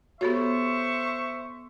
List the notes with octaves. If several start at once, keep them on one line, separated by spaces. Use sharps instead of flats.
B3 F#4 G4 A4 C5 C#5 E5 C#6